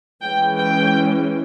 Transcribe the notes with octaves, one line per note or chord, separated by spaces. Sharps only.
E3 G#3 C#4 G5
G5